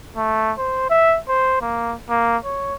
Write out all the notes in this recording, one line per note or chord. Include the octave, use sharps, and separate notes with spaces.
A3
C5
E5
C5
A#3
A#3
C#5